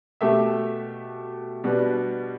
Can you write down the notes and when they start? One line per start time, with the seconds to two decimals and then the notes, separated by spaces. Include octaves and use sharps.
0.21 B2 A3 G4 E5
1.64 B2 G3 D4 B4